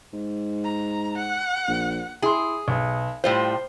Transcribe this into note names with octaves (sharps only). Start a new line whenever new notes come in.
G#2
A#5
F#5
A#1
E4 G#4 C6
B1
A2 G3 F4 C5